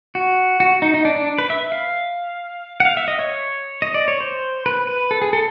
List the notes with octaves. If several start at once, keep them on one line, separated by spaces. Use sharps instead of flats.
F#4
F#4
D#4
D#4
D4
D4
B4
E5
F5
F#5
F5
E5
D#5
C#5
D#5
D5
C#5
C5
B4
B4
A4
G#4
A4